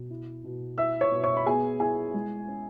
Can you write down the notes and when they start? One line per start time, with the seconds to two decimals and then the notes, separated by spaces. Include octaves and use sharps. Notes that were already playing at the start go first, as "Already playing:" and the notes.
Already playing: B2
0.10 E4
0.44 B2
0.78 E4 E5 E6
1.01 C#5 C#6
1.12 B2
1.24 C#5 C#6
1.37 B5
1.46 B3 G#4 G#5
1.80 E4 G#4 G#5
2.14 G#3
2.48 C#4